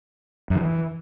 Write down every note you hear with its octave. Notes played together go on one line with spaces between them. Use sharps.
F#2
D#3
E3